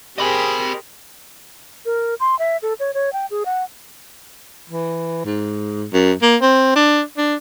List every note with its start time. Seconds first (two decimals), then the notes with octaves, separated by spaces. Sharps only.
0.18 G4 G#4 A#4 C5 D#5 B5
1.86 A#4
2.20 C6
2.39 E5
2.62 A4
2.80 C#5
2.94 C#5
3.13 G5
3.31 G#4
3.46 F#5
4.70 E3
5.25 G#2
5.93 F#2
6.22 A#3
6.42 C4
6.75 D4
7.18 D4